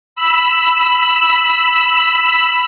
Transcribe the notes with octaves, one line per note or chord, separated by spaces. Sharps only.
B5 E6